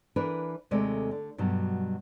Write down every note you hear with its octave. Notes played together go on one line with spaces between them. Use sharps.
E3 D4 A#4 B4
D#2 C3 G#3 A3 D5
D3
G2 B2 F#3 G3